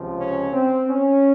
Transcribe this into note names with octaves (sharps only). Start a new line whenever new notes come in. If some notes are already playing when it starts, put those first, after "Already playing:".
Already playing: C#2 C3 F3
C#4
C4
C#4